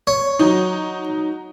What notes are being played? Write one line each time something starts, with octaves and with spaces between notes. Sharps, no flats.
C#5
F#3 D#4